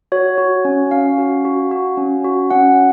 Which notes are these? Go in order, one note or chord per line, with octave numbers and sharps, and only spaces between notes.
F#4 C#5
F#4
C#4
C#4 F5
F#4
F#4
F#4
C#4
F#4
C#4 F#5